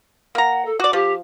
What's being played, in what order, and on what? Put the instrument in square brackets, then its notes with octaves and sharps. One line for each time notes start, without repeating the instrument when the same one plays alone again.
[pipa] A#3 A#5 [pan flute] F#5
[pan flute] A4
[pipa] F#4 D5 [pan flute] D6
[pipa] F3 [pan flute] G4